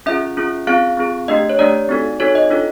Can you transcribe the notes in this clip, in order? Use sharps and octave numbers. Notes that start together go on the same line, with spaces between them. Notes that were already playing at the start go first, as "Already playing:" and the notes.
C#4 F4 G#4 E5
C#4 F4 G#4
C4 F4 G#4 F5
C4 F4 G#4
A3 D4 G4 D#5
C#5
A3 D4 G4 D5
C4 D#4 F#4 A4
C4 D#4 F#4 A4 C#5
D#5
D4 F4 A4